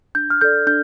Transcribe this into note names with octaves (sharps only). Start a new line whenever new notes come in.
D4 G6
F6
A4 D5 G6
D4 G6